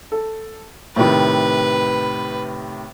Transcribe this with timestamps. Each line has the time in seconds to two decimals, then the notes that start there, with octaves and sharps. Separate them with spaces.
0.12 A4
0.96 A2 C3 D#3 B4